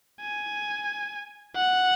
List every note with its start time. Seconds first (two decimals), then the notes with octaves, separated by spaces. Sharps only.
0.21 G#5
1.55 F#5